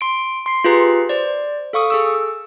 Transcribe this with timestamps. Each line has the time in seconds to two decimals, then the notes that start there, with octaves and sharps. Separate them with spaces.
0.01 C6 D7
0.46 C6 C7
0.64 F4 G4 G#4 B4 A#5 C7
1.09 C5 D5
1.73 A4 F5 C#6 D#6
1.90 G#4 A4 E6